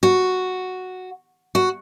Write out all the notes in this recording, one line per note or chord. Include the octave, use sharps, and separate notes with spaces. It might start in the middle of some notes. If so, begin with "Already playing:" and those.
F#4
F#4